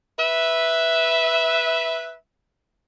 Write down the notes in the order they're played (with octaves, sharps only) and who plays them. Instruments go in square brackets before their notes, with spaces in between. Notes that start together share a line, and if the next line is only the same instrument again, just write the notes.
[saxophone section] B4 E5